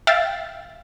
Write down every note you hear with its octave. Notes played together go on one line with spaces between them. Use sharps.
E5 F5 G5 A6